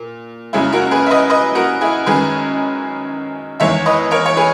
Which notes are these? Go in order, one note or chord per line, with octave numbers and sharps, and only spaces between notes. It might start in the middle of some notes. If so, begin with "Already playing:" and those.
Already playing: A#2
F#2 C#3 G#3 E4 G#4
F#4 A#4
G#4 B4
E5
B4 D#5
B4 D#5
F#4 A#4
E4 G#4
F#2 D#3 G#3 G#4 B4
E2 D#3 G#3 C#5 E5
B4 D#5
A#4 C#5
C#5
G#4 B4